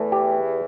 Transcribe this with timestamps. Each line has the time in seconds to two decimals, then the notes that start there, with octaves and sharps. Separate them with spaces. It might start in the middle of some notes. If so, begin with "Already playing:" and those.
Already playing: E2 E3 A3
0.12 G4